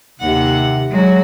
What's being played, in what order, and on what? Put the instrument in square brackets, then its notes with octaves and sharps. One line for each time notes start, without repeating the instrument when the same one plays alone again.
[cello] D#2 F#5 [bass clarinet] C3
[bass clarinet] F#3 [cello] G#3 F#4